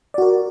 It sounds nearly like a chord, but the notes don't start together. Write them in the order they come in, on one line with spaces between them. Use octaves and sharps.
D5 F#4 A#4